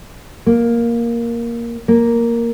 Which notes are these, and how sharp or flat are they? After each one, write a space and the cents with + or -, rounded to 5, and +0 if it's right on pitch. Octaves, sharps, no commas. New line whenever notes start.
A#3 +5
A#3 +0